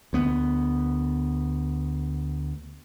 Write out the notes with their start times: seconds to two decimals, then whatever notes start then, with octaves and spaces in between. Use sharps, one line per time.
0.13 D2 B3